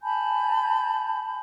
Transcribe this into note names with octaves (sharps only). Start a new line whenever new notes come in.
G#5 A5 B5 G6